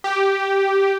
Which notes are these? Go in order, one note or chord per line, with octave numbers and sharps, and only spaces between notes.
G4